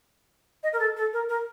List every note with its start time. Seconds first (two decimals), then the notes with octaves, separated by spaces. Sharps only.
0.63 D#5
0.73 A#4
0.80 A4
0.97 A4
1.13 A#4
1.29 A#4